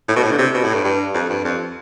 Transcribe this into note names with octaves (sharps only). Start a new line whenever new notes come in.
A2
B2
A2
D3
C3
B2
A2
G2
G2
F2
G2
F2